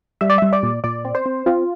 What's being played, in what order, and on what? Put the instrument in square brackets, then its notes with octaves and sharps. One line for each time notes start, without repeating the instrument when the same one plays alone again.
[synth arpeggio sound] G3 E5
D5
G3 E5
D5
A#2
A#2 D5
C4
C5
C4
C4 F4